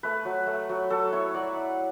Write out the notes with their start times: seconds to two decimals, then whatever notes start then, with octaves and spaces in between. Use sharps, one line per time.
0.03 A3 B4
0.25 F#3
0.47 A3
0.69 F#3
0.90 F#3 A4
1.12 E4 C#5
1.34 F#3 D5
1.56 E4